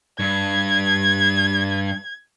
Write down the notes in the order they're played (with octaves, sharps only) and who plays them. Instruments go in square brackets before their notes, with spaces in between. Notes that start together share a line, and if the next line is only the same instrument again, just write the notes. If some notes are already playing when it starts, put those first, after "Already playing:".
[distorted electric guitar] G2 [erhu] G#6